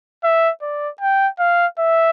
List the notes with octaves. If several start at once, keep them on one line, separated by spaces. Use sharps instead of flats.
E5
D5
G5
F5
E5